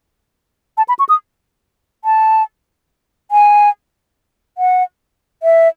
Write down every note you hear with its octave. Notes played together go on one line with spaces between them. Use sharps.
A5
B5
C#6
D#6
A5
G#5
F#5
E5